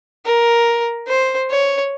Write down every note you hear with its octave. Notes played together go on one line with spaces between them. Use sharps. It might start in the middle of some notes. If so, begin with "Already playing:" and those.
A#4
C5
C#5